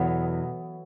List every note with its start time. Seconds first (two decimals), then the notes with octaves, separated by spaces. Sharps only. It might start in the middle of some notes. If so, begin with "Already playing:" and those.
Already playing: E2 B2 F#3 B3 A4